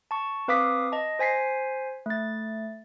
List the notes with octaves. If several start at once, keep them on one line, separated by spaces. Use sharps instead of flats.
A5 C#6
C4 B4 F5 D6 D#6 B6
D#5 A5
C5 G#5 B6 C7
A3 A6